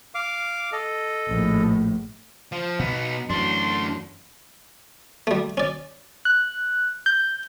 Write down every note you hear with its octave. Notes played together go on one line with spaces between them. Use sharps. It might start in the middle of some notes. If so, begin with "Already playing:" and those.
F5 D6
A4 D#5
A#1 A2
F3
B2 B3 D#4
F#2 E3 F#3 A3 D4 C6
G3 A3
C#4 D5
F#6
G6